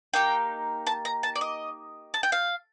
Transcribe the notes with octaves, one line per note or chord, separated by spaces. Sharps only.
A#3 D#4 G4 G5
A5
A#5
A5
D5
D#5
A5
G5
F5